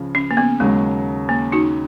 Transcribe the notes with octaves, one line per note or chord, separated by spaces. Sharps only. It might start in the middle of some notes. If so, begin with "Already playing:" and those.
Already playing: C#2 C#3 F3
C#4
A#3
B3
D#2 C#3 F#3 G#3
A#3
D#4 F#4